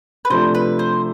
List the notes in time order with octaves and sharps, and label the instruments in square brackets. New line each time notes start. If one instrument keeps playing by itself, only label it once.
[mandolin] B4
[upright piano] C3 F3 A3 D4 [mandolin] C5
[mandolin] B4
C5